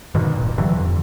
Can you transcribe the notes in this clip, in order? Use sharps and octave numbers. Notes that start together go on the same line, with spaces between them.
G2 B2 D3 D#3
D1 A#2
G2 D3 E3 F#3
F2